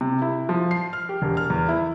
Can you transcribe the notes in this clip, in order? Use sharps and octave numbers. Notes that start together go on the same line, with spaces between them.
C3
E4
F3
C7
F6
G4
E1
F6
E2
E4